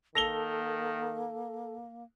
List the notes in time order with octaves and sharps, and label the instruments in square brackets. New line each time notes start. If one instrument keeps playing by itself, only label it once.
[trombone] D#3 [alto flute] A#3 [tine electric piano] A4 [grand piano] A#6 F7 G7